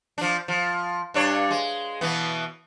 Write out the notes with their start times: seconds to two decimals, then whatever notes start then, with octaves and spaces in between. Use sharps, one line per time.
0.18 F3 D4
0.48 F3
1.14 G2 D4 C#5
1.51 G#3
2.01 B2 E3 B3